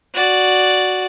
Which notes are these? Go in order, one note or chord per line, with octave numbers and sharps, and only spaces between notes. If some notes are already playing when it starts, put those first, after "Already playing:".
F#4 D5